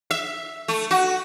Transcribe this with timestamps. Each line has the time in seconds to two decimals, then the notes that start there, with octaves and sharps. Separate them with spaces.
0.11 E5
0.68 A3
0.91 F#4